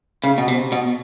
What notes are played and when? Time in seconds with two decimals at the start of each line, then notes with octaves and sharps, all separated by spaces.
0.24 C#3
0.38 B2
0.48 C3
0.72 B2